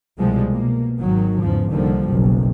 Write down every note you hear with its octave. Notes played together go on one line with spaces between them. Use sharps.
C2 B2 F3 G3 G#3
B2 A#3
G#1 D#3 F#3
E2 G#2 C#3 F3
C2 D3 D#3 F3 G3 A#3
F#1 B1 F#2